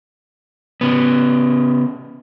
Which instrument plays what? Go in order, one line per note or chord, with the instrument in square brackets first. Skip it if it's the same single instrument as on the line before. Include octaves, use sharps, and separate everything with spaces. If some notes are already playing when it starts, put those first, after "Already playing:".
[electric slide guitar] C#3 B3